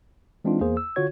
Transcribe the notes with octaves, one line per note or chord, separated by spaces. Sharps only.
E3 G#3 C4 D4 D#4 F4
E2 A#3 G#4 C5
E6
D3 F4 F#4 C#5 G#6